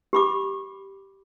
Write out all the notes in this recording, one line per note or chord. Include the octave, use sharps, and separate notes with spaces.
G4 B5 D6